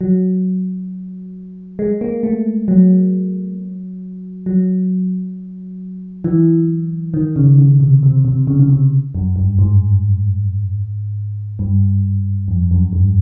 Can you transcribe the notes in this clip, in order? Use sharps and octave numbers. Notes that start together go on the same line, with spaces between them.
F#3
G#3
A#3
A3
F#3
F#3
E3
D#3
C#3
C#3
C3
C3
C3
C#3
C#3
C3
F#2
G2
G#2
G2
F2
F#2
G2